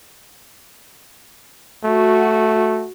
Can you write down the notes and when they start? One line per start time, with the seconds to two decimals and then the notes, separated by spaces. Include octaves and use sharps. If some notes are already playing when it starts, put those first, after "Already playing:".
1.84 A3 F#4